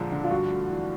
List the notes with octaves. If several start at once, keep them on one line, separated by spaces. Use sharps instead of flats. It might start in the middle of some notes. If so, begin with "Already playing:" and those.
Already playing: A#2 D3 F3 G#3
D3
F4
G2 F#4
A3
E3